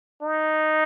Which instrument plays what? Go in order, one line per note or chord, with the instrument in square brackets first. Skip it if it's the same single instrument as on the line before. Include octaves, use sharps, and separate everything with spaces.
[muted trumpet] D#4